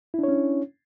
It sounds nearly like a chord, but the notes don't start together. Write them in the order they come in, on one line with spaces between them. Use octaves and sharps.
E4 D4 C#5 C#4